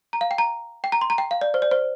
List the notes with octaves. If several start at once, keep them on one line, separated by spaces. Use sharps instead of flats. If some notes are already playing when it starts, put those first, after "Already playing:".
A#5
F5
G5
A#5
G5
A#5
C6
A#5
G5
F5
D5
C5
D5
C5